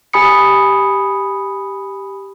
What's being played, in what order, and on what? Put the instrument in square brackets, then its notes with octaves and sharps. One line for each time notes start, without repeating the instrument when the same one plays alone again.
[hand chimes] G4 G#5 B5 D#6 C#7